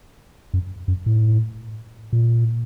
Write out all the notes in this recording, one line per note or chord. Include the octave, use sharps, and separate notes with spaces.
F#2
F#2
A2
A#2